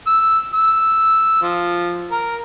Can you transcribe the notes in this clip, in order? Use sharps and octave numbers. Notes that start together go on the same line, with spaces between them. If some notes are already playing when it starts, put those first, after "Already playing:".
E6
E6
F3
A#4